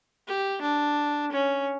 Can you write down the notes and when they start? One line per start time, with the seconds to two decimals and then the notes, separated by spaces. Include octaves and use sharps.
0.27 G4
0.61 D4
1.32 C#4